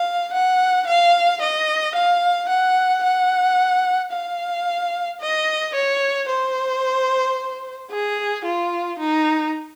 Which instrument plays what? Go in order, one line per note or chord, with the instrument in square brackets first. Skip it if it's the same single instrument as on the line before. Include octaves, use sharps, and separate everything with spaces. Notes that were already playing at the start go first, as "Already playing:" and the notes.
Already playing: [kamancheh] F5
F#5
F5
D#5
F5
F#5
F#5
F5
D#5
C#5
C5
G#4
F4
D#4